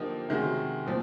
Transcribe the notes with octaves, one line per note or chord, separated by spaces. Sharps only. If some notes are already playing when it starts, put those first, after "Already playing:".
Already playing: D3 F3 A#3 D#4 G4
C3 D#3 G#3 C#4 F#4
A#2 F3